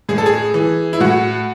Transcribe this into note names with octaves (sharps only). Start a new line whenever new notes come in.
A2 G#4
A4
G#4
E3
E4
A2 F#4